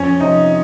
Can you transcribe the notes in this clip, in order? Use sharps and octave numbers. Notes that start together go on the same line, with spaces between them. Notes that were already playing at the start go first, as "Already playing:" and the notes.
Already playing: F2 C#4
C3 F3 D#4